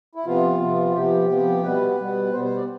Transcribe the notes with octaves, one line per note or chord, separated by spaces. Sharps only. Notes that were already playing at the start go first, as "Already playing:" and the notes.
E4
C3 F3 B3 F4
C3 F3 B3
C3 F3 B3 G4
C3 F3 B3
B2 G3 B3 B4
B2 G3 B3
B2 G3 B3 C5
C5
D5